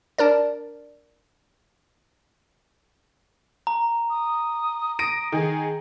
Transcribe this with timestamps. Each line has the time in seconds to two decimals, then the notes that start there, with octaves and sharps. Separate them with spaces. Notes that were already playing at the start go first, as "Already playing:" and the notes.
0.18 D4 A#4 D5
3.67 A#5
4.10 D#6
4.99 A#6 D7 D#7
5.32 D#3 G#4 G#5